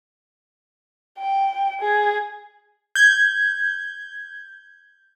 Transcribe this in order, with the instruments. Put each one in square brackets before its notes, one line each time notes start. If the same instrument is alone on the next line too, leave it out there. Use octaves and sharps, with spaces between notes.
[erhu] G5
G#4
[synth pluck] G6 G#6